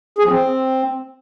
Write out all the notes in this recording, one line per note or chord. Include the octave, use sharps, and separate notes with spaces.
G#4
F3
C4